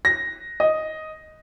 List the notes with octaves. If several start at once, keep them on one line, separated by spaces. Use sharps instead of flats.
A#6
D#5